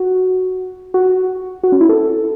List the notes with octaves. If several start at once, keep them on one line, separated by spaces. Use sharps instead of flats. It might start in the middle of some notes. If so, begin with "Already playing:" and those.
Already playing: F#4
F#4
F#4
C#4
E4
A4